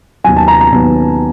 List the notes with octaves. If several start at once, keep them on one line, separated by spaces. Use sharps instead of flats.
D#2 D#3 F#3 B3 G#5
A5
A#5
A#5
D#2 D#3 F#3 B3